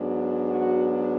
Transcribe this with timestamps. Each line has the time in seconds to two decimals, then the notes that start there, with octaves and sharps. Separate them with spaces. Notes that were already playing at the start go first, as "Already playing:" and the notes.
Already playing: G#2 F#3 B3 D4
0.48 F#4